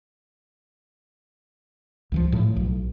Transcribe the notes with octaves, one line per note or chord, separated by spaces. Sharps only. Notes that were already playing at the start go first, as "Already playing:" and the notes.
C#2 E3 F3
A2 F3 A3
B1